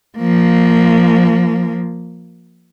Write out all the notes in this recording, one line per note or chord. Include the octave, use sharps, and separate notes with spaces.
F3 A#3